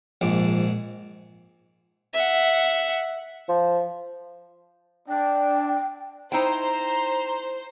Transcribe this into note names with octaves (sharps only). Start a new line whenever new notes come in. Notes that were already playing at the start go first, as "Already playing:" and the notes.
A#1 G#2 F3 D6
E5 F#5
F3
D4 G5
D#4 E4 C5 G5 A#5